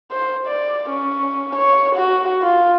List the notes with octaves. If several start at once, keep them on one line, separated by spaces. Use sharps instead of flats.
C5
D5
C#4
C#5
F#4
F4